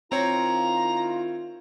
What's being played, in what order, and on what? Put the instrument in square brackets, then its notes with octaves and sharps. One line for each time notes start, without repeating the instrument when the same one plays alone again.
[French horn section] D#3 E4 F4 [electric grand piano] C4 C#5 [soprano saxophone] A#5